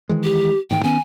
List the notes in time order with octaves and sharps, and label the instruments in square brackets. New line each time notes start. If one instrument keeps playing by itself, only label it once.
[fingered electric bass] D#3 E3 G#3
[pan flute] G4
[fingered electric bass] A1 G#2 D#3 [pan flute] G5
[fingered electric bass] D#3 B3 C#4 [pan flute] G#5